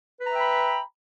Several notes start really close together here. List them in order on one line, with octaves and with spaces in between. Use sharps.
B4 A#5 E5 G5 B5